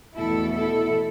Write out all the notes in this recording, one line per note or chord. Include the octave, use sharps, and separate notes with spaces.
E2 B2 A3 E4 A4
E4 A4